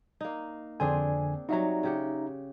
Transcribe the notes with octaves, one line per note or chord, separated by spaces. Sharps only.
A#3 D#4
F2 D3 C4 D4 G#4 G#5
F#3 G3 D#4 F#4 E5 A#5
C#3 G4 F#5